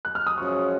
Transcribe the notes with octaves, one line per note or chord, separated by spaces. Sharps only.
F#6
F6
D#6
F#2 F3 G#3 C#4 C#6